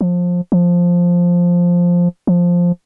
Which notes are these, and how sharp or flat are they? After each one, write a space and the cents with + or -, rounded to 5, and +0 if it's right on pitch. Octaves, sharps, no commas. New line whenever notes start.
F3 +20
F3 +5
F3 +5